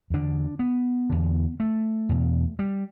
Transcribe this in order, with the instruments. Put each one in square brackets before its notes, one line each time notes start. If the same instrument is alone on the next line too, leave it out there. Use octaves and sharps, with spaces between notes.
[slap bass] E2 D3 D4
B3
E2 D3
A3
E2 B2
G3